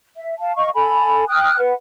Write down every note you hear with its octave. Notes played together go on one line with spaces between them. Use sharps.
E5
F5 A5
D#5 F5 C#6
A4 G#5 B5
G5 D#6 F6 F#6
B4 F#5